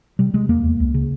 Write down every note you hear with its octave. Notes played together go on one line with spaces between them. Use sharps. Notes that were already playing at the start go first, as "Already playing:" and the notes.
C3 G3
C3 G#3
E2 A#3
E2
C#2
C#3